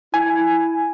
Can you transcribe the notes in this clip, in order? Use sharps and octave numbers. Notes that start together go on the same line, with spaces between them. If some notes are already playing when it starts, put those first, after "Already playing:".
E4 G#5